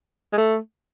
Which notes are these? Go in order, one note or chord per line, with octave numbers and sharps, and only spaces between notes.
G#3
A3